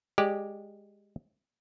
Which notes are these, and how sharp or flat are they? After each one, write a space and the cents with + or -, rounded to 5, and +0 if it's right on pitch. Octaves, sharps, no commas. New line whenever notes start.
G#3 -10 G4 +0 D5 +0